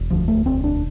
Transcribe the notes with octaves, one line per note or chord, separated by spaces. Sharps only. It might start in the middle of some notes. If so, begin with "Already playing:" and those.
Already playing: E1
D2 F3
A3
E1 C4
D4